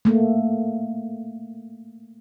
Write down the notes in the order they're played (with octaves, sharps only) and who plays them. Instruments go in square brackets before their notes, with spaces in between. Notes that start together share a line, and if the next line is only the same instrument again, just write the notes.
[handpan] A3 A#3